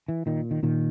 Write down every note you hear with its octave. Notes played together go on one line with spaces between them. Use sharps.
E3
A#2 D#3
D#3
A#2 D#3